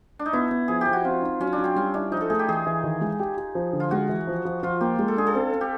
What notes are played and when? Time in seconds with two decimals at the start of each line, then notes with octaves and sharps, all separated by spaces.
0.19 D4
0.26 D#4
0.33 B3 E4
0.51 B3
0.68 F3 G#4
0.81 G4
0.87 F3
0.93 F#4
1.05 C4 F4
1.22 D#4
1.40 F#3 C#4
1.53 D4
1.58 F#3
1.64 C4
1.76 G3 C#4
1.94 D4 E4
2.12 F3 D#4
2.21 A4
2.30 A3 G#4
2.39 G4
2.48 E3 G#4
2.67 E3
2.84 D#3
3.01 G#3
3.20 G4
3.37 G4
3.55 F3
3.73 D3
3.80 F4
3.91 G#3 F#4
4.09 E3
4.27 F3
4.45 F3
4.63 F3 F4
4.81 A#3 G4
4.99 G#3
5.08 A4
5.17 D4 G#4
5.27 A4
5.35 C4
5.53 C4
5.61 G4